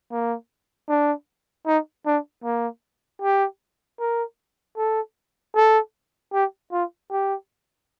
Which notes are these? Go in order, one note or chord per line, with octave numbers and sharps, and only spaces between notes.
A#3
D4
D#4
D4
A#3
G4
A#4
A4
A4
G4
F4
G4